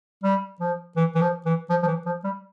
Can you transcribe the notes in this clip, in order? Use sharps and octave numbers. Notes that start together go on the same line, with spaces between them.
G3
F3
E3
E3
F3
E3
F3
F3
E3
F3
G3